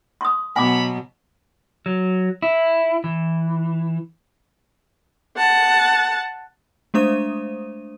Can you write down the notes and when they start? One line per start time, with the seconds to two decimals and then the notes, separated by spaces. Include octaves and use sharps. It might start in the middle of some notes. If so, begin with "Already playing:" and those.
0.21 C6 D#6
0.56 B2 F#3 B3 G#5 B5 D6
1.86 F#3
2.42 E4
3.04 E3
5.37 F#5 A5
6.94 G#3 A3 D4 C5 D#6 D#7